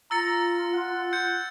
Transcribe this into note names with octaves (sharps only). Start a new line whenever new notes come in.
F4 A#5 E6 A6 C#7
F#5
G6 C#7